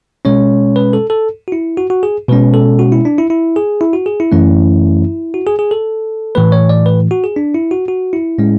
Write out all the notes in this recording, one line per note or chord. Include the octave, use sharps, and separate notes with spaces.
B2 G#3 C#4 C#5
B4
A4
A4
F#4
E4
F#4
F#4
G#4
B2 G#3 C#4 B4
A4
F#4
E4
D4
E4
E4
G#4
E4
F#4
G#4
E4
F#2 E3 A3 C#4
F#4
G#4
G#4
A4
A2 E3 A3 B4
C#5
D5
B4
F#4
G#4
D4
E4
F#4
F#4
E4
A2 G#3 C#4